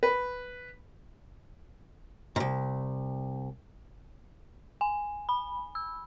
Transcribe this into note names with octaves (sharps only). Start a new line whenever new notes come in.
B4
C2 G#2
G#5
B5
E6